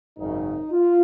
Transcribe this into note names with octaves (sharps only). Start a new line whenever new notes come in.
G#1 F#2 C#3 D#4
F4